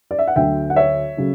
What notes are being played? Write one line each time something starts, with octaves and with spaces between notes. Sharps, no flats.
D5
E5
F#5
D2 D3 F#3 A3 E5 G5
F#5
C#5 E5
C#3 F#3 A3